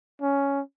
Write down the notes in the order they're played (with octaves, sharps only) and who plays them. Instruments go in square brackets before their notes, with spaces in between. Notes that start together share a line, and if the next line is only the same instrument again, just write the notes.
[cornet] C#4